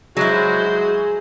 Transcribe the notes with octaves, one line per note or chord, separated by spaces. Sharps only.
F#3 G#3 E4 F#4 G#4 C5